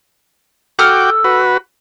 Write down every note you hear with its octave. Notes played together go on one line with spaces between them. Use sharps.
F#4 A4 G5 D6 D#6 F6
F#4 B4